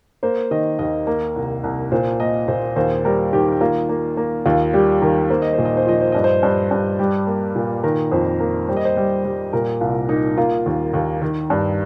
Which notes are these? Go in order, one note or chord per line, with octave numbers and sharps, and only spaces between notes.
A#3 C5
D#3 D#5
D#2 D#5
A#3
C2
C2
A#2 C5
A#3 D#5
A#2 C5
D#2 C5
G3 A#4
D#3 G4
A#3 F4
A#3
A#3
D#2 F4
G3 G4
D#3 A#4
A#3 C5
D#5
A#2 C5
D#5
C5
F3 D#5
C5
G2 D#5
C5
G2
G2
G3 G4
A#3
A#2
D#3 A#4
F2 C5
A#3
G3 C5
D#5
C5
G3
G3
A#2 A#4
C2 F4
A#3 D#4
A#3 F4
D#2
D#2
D#3
G2